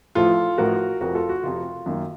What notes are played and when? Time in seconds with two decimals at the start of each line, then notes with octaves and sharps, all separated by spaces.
0.15 A1 A2 F3 F4 A4
0.58 A1 A2 F3 F#4 A#4
1.01 F1 F2 C3 F#4 A#4
1.15 F4 A4
1.29 F#4
1.43 F1 F2 C3 F4
1.86 F#2 D#3 A#3